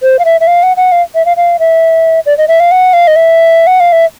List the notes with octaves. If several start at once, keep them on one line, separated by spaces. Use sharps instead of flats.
C5
F5
E5
E5
F5
F#5
F#5
F5
E5
F5
F5
E5
D5
D#5
E5
F5
F#5
F5
D#5
E5
F#5
F5
E5